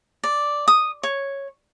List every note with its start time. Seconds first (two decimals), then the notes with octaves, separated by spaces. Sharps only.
0.24 D5
0.68 D#6
1.03 C#5